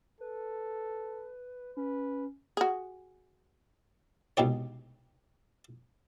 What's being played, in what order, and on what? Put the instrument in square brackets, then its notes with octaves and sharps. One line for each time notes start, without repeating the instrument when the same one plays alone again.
[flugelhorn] A4 [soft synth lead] B4
[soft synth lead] C#4 [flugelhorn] B4
[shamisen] F#4 G#4
[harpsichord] C2 G#2 B2 G4 C#5